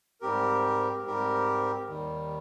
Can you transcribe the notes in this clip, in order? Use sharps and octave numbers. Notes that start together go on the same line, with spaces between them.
G#2 G3 C4 G4 A#4
G#2 G3 C4 G4 A#4
D#2 D#3 G3